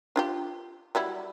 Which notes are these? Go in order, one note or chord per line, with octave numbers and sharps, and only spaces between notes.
D4 F4 G4
F#3 G3 E4